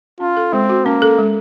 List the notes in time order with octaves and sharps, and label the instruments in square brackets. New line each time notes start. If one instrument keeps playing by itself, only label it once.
[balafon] C#4 [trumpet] F4
[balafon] A4
[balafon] G#3 [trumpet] C4
[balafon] F#4
[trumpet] A#3 [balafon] C#4
[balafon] A4
G#3